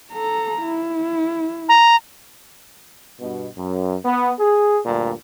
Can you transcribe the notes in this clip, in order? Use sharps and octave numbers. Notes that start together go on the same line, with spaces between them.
A4 A#5
E4
A#5
G2 B2
F#2
B3
G#4
D2 G2 A#2